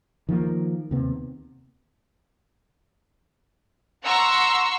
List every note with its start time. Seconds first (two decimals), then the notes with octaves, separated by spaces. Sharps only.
0.29 D#3 F3 A3 A#3
0.91 D#2 C3 B3
4.03 F#5 A#5 C6 C#6 E6